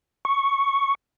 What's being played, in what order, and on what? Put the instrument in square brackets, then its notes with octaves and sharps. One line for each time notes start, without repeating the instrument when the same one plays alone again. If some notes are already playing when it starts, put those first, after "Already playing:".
[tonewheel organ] C#6